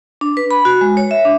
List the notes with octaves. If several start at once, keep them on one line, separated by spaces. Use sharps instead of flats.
D4
B4
B5
F#4
G#3
C#5
E5
D4